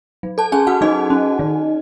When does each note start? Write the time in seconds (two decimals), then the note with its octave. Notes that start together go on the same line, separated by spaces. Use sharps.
0.23 F#3
0.38 A4 A5
0.52 C#4 G#4 G#5
0.67 F#4 F#5
0.81 F#3 D#4 D#5
1.10 C#4
1.39 D#3